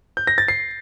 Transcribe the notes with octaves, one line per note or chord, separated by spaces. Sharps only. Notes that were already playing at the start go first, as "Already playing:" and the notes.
G6
A#6
A6
C7